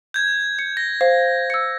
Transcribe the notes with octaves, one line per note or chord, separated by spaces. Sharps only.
G6 G#6
C#7
A#6
C5 F5
E6 C#7